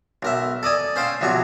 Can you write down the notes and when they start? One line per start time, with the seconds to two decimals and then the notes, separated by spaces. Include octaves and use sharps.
0.23 B1 A#4 E5
0.63 A4 D5 D#5 G#5
0.96 C#4 C5 F5 G5 A5
1.21 B1 C3 F3 F#3 C#6